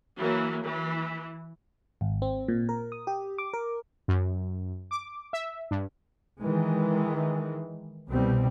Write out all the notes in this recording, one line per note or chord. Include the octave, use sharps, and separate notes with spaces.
E3 F#3 A#3
E3
G#1
C4
A#2
A#4
D#6
G4
D6
A#4
F#2
D6
E5
G2
D#3 E3 G#3
C2 B2 G3 C4